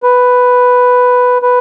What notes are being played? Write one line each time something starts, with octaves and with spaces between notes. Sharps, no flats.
B4
B4